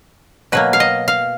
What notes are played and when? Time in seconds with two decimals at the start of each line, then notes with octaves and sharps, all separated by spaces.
0.52 B2 F#3 A#3 B4
0.73 F5
0.80 D#5
1.08 F5